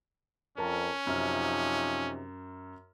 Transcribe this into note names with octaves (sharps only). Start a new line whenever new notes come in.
F2 C#4 A#4 A5
F#2 C3 F3 D#4 F6